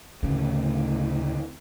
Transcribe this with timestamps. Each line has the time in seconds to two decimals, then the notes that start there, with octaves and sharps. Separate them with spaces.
0.23 D2 A2 C#3